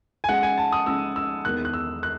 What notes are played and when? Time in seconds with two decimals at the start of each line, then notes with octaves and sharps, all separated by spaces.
0.24 G#5
0.29 C#2 C#3 G#3 F#5
0.43 G#5
0.58 A5
0.73 D#6
0.86 C#2 C#3 G#3 E6
1.16 E6
1.45 E1 E2 D#3 F#6
1.65 F#6
1.74 E6
2.03 F#6